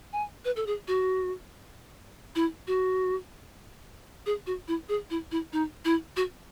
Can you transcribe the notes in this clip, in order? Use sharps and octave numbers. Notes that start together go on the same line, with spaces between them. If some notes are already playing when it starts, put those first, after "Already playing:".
G#5
B4
A4
G#4
F#4
E4
F#4
G#4
F#4
E4
G#4
E4
E4
D#4
E4
F#4